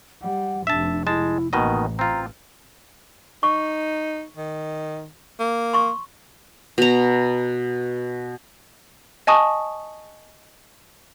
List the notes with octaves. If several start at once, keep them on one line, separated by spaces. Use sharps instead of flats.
G3 F#5
F1 C3 D4 E5 A5
G#3 E4 A5
A1 B2 D#3 A#3 D#5
C4 F4 A#5
D#4 C#6
D#3
A#3
C6 C#6
B2 A#5
D#5 G#5 A5 C#6 D#6